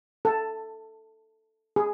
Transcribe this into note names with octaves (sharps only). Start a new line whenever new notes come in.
A4
G#4